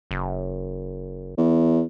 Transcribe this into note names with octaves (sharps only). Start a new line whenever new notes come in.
F#1
E2